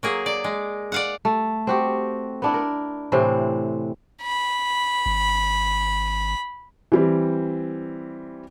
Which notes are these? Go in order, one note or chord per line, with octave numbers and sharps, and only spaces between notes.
F#3 A#3 G#4
D5
G#3
D5 F5 F#5
A3
C4 F#4 G4
B3 D4 E4
A#4
A2 C3 E3 C4
B5
G#1
E3 G3 C4